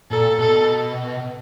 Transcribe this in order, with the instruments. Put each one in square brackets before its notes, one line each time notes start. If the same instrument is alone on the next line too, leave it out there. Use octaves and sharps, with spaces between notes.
[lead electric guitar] A#2 [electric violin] A4
[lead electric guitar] B2 [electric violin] A4